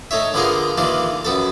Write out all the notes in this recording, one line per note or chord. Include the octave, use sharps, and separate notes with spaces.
A3 D#4 C#5 E5
D3 B3 F4 G#4 A#4
D#2 D#3 E3 D4 F4
F#2 B3 A4